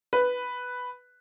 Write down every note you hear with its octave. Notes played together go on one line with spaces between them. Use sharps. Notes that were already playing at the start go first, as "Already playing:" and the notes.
B4